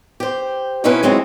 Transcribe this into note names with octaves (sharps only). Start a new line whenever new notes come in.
G4 C5
B2 C4 C#4 D#4 E4 B4
F#3 G#3 C4 D#4 E4